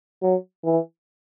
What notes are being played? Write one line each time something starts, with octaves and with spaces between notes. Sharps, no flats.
F#3
E3